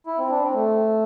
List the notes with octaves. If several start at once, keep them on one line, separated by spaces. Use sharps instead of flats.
E4
C4
D4
C4
A3